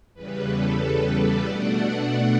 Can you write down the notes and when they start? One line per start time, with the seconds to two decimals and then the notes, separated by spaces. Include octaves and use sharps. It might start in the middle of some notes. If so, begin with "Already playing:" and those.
0.14 E2 C#3 G3 B4
0.47 A4
0.79 B4
1.12 B4 D5
1.44 B2 A3 D4 D5 F#5